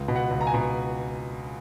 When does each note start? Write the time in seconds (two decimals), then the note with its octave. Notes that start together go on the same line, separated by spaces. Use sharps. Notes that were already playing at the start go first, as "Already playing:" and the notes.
Already playing: C#2
0.08 B2
0.16 F#5
0.31 C#2
0.41 A#5
0.47 G#5
0.54 B2